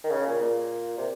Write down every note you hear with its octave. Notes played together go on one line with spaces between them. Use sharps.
D#3
C#3
A#2
A#2
C3